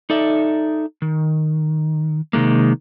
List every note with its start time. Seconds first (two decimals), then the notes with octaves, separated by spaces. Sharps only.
0.10 D#4 A4 D5 E5
1.02 D#3
2.33 C3 D#3 G#3 A#3